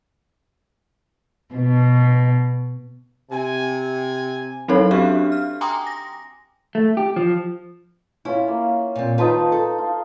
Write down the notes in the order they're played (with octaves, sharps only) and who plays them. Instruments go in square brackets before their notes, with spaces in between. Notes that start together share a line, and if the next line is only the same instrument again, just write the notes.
[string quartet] B2
[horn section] C3 G#5
[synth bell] F#3 C4 C#4 D#4 A4 C#5
D4 F#4 G4 E5 F5
F6
G5 G#5 A#5 C6 D6 D#6
A#6
[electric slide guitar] A3
G4
F3
[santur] C#4 F4 [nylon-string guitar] E4
[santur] A#3
[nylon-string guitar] A#2 C4
[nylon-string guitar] D#3 F4 B4 [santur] D#4 C5 A5
[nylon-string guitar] A4
[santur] F4